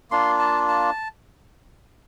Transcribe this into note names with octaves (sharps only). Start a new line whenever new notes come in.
A#3 D4 F4 C6
A5
A5